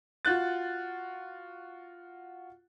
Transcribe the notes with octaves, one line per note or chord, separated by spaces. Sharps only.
F4 F#4 F#6 A6